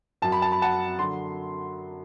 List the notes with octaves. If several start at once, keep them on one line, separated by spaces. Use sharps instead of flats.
F#2 F#3 A5
B5
A5
B5
F#5 A5
D3 F#3 C6